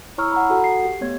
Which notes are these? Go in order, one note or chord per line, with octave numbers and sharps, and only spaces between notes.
E4 C#5 A#5 C#6 E6 F6
F#5 A#5 B5
F#4 A4 F#5
C7
G4
A3 B3 C#5 G#6